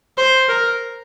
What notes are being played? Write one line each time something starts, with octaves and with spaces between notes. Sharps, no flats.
C5
A#4